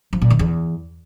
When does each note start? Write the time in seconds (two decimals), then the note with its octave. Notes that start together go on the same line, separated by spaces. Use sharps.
0.13 F3
0.22 A#2
0.30 D#3
0.39 E2